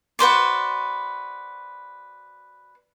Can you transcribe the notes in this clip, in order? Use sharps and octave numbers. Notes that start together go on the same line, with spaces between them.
F#4 B4 C5 D5